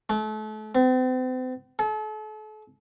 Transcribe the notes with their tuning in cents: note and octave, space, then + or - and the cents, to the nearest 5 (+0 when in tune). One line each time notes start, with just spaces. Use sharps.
A3 -35
C4 -40
A4 -40